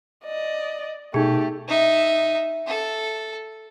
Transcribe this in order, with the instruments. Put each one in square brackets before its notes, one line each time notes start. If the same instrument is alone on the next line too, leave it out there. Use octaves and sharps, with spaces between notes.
[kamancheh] D5 D#5
[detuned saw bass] B2 [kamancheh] A3 G4 [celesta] D#4 G#4
[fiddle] D#4 E5
A4